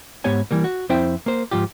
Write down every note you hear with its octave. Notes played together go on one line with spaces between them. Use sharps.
G#2 B3 G4 C#5 G#5
E3 G3 A#3
F#4
F2 C4 E4 C5 E5 G5
A#3 C5
G#2 F3 F4 G4